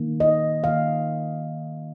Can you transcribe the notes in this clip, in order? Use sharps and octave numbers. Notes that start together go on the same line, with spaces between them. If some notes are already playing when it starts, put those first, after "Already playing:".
Already playing: D#3 A#3
D#5
D#3 A#3 F5